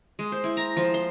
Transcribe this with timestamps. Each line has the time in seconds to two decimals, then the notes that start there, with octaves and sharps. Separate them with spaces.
0.19 G#3
0.32 C5
0.44 E4
0.57 A#5
0.77 F3
0.94 C6